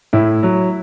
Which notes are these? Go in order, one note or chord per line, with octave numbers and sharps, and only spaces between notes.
A2 E4
F#3